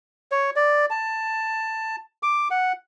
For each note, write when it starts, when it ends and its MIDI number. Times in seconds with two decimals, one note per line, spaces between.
0.32 0.50 73
0.56 0.86 74
0.90 1.96 81
2.23 2.48 86
2.51 2.72 78